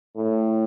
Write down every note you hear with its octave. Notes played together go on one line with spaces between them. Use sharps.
A2